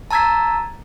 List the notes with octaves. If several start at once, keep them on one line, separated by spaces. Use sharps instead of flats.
A5 A#5 E6 G#6 A6 B6